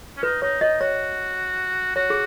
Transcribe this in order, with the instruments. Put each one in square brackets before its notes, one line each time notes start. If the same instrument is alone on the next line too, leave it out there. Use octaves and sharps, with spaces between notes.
[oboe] C#4
[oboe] D#4 [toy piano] B4
[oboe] D#4 [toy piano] C#5
[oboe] D#4 [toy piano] D#5
[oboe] F#4 [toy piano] C#5
[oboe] F#4 [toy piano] C#5
[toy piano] G#4